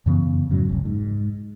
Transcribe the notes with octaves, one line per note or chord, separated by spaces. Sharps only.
F#2 C#3 E3 B3
F2 G#2 C#3 F#3
F1 C2
G#2